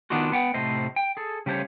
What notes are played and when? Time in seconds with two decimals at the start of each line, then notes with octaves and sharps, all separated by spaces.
0.10 D#3 B3 D4 D#4 F4 F#4
0.32 B3 F#5 G5
0.54 A2 C3 A3 C5 D#5
0.96 G5
1.17 G#4 A4
1.46 C#3 G3 A3 A4 C5 C#5